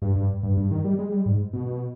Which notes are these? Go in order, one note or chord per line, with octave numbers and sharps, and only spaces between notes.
G2
G2
G2
G2
D#3
G3
G#3
G3
G#2
B2
B2